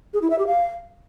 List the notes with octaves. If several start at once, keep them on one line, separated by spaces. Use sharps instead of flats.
G#4
E4
E5
G4
F5